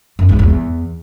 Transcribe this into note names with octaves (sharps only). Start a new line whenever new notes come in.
F#2
G#2
E2